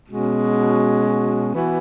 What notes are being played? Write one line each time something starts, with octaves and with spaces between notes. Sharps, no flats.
B2 G#3 C#4 F#4
E3 B3 F#4